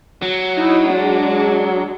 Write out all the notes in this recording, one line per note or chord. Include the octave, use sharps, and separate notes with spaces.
F#3
D#4 E4
G#3 D4